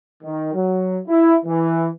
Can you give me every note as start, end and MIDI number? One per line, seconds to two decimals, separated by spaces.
0.24 0.50 51
0.54 0.98 54
1.08 1.35 64
1.45 1.88 52